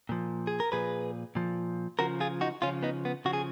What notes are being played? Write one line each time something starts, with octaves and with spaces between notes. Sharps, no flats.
A#2 F3
G#4
A#4
A#2 F3 G#4 B4
A#2 F3
C#3 F3 F#4 A#4
F4 G#4
D#4 F#4
C#3 F3 C#4 F4
B3 D#4
B3
C#3 F3 F#4
G#4